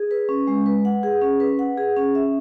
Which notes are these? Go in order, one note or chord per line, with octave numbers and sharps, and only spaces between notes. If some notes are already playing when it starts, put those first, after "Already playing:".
Already playing: G#4
B4
C#4
G#3
B4
F#5
G#4
C#4
B4
F#5
G#4
C#4
E5